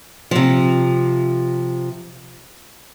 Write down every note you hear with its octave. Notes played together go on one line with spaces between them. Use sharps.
C3 F3